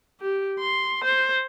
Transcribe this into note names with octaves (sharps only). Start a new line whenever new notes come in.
G4
C6
C5